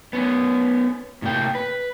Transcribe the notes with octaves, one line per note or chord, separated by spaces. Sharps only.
B3 C#4
A2 C3 A#3 G5
B4